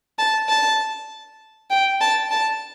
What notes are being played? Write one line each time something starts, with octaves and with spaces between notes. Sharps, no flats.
A5
A5
G5
A5
A5